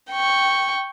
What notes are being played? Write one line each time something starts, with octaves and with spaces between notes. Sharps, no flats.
G5 C#6